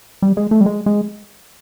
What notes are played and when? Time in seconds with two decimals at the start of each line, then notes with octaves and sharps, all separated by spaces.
0.22 G3
0.37 G#3
0.51 A3
0.61 G3
0.66 G#3
0.86 G#3